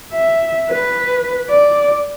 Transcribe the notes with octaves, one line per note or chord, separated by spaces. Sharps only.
E5
B4
D5